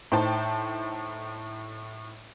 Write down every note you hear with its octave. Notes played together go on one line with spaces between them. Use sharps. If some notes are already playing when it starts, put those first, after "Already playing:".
A2 D#4 C5 G5 A5